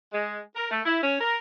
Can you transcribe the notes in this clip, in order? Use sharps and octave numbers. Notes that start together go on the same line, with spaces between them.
G#3
A#4
A3
E4
C#4
A#4